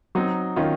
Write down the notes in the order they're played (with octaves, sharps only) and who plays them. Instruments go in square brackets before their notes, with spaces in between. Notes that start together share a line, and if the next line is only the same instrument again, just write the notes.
[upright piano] F#3 [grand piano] C4 D#4
[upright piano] D#3 [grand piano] C#4 F4